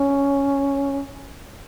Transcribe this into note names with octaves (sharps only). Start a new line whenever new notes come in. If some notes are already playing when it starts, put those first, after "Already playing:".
Already playing: C#4